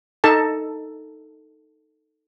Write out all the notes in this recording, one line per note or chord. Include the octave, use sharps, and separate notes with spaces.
D#4 A4 A5